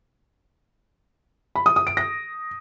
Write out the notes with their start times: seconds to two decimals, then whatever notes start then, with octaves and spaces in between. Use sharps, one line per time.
1.55 B5
1.66 D#6
1.76 D#6
1.87 D7
1.97 A#6